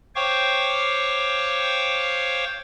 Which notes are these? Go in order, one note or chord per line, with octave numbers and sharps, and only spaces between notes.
C5 C#5 F5 G5 C#6 D6